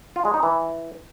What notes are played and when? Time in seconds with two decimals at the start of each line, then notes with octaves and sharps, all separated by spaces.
0.16 F4
0.25 G#3
0.34 D#4
0.43 E3